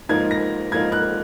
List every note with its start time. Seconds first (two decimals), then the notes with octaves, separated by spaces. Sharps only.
0.09 G#2 F3 A#3 D#4 G#6
0.31 A#6
0.72 G#2 F3 A#3 D#4 G#6
0.92 F#6